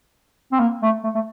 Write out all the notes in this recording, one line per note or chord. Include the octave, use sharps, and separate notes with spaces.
C4
A#3
A3
A3
A3